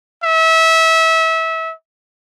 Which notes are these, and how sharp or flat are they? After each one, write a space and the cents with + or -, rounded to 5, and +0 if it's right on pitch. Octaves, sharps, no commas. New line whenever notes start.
E5 -25